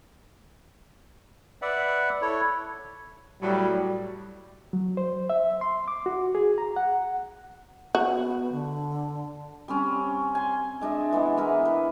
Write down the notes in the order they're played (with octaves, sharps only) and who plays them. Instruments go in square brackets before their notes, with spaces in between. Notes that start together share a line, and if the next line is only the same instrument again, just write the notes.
[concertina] B4 D5 E5 F#5
E4 A4 C#5
[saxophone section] A2 F#3 [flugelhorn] G3
[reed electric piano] F#3
C5
E5
C6
D6
F#4
G#4
A#5
F#5
[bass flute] B3 [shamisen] F#4
[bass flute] D3
[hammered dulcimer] G3 C4 C#4
G#5 C6
G#3 D4 D#5 E5
E3 G#3 B3
B3 E4 A#4
B4